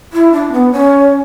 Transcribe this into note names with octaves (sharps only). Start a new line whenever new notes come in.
E4
D4
B3
C#4